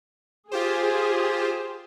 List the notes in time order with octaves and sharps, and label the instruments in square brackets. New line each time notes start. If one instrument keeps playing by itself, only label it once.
[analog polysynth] F4 G4 C5 [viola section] G#4